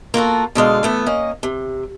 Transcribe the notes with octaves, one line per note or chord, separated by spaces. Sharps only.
A#3 F4 F#4 A4
B2 D3 G#3 F5
E3 A3 B3
A#3 C#4 D#5
C3